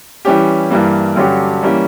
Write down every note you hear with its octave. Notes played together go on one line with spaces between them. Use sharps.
E3 G3 C#4 G4
G2 E3 G3 A#3
G2 D3 F#3 C#4 G4
E3 G3 A#3 C#4